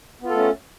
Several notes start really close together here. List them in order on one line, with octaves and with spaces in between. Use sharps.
B3 F4 A4 A3 C#4